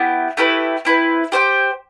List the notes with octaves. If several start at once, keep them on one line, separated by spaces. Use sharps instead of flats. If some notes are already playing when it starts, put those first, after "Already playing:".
Already playing: B3 E4 G4
A3 E4 G4 B4
C4 E4 B4
G4 C5 E5 G5